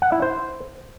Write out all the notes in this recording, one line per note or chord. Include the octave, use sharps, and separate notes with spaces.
F#5
E4
C5